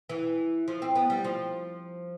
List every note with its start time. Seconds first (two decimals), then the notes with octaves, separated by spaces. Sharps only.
0.09 E3
0.68 F3
0.82 C4
0.95 B3
1.10 G3
1.24 F3